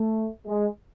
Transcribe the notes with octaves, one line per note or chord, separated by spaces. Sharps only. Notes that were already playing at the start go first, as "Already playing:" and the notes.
Already playing: A3
G#3